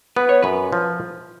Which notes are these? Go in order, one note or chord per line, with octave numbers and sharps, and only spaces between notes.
B3 B4
C#5
F#2 B4
F3